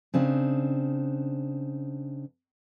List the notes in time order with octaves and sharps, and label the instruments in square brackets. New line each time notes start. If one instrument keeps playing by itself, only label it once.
[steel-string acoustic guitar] C#3 C4 D4 D#4